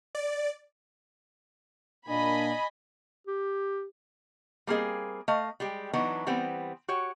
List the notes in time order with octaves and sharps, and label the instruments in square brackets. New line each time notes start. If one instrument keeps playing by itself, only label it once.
[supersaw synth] D5
[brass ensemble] A#2 A#3 D4 [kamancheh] D#5 G#5 [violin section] B5
[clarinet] G4
[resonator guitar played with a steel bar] G3 A#3 C4 G#4 D#5
A3 D#5 F5
G3 G#3 G4
E3 F#3 B3 D4 D#4
E3 G3 B3 C4
F#4 G4 C#5